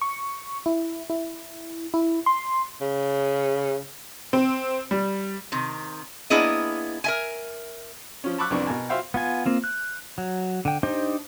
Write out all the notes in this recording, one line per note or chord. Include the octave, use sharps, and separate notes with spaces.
C#6
E4
E4
E4
C6
C#3
C4
G3
C3 D#3
A#3 B3 D4 E4 G#4 D#5
A#4 E5 G#5
F3 C#4
A5 B5 C#6 D6 E6 F#6
C2 F2 B3 D4 C#6
B2 A#4 G#5 A5
F4 F#4 C5 E5 F5 G5
B3 F4 G#5
A#3 C4 F4
F#6
F#3
D3 G5
D4 D#4 G4 C5 D#5